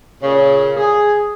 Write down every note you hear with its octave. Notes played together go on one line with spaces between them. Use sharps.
A#2 C#3
G#4